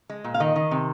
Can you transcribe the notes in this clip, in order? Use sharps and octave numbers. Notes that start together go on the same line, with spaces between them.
G#3
A#2
F5
D#3 D#5
D#3
C3